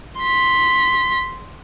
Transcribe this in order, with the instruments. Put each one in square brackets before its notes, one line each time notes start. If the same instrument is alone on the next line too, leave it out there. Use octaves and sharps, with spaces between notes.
[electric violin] C6 B6